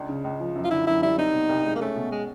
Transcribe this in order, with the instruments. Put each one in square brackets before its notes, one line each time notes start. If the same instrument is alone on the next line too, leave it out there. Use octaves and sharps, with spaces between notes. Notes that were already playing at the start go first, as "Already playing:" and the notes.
Already playing: [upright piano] C#2 D4
C#3
C#2
F3
F#2
[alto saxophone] F4
[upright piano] D3 [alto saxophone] E4
[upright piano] F#2 [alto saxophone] E4
[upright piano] G3 [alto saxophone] E4
[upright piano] C4 [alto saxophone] D#4
[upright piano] B2
C2
G#3
[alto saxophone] A#3
[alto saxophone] A3 [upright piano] C#4
[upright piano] B2
[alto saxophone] G#3